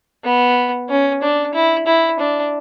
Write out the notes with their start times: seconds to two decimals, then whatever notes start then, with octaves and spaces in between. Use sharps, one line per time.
0.24 B3
0.89 C#4
1.22 D4
1.54 E4
1.87 E4
2.19 D4